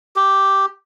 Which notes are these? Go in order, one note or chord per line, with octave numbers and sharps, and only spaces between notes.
G4